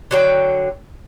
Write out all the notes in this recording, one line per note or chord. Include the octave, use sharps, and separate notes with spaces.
D3 F#3 G5